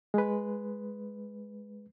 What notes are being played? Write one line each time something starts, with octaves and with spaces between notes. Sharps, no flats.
G#3 B4